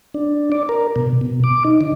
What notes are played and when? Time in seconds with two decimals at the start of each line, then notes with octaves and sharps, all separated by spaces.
0.14 D4
0.52 D5
0.69 A#4
0.96 B2
1.21 B2
1.44 D6
1.64 D#4
1.81 D3